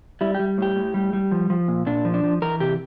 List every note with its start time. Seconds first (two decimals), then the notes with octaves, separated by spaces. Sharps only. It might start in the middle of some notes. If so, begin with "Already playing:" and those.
0.21 G3 E4
0.35 G4
0.39 G3
0.58 A2 G4
0.76 A2
0.94 G3
1.13 G3
1.32 F3
1.50 F3
1.68 A#2
1.86 A#2 D4
2.05 F3
2.14 D4
2.24 F3
2.42 E3 A#4
2.60 C3 G4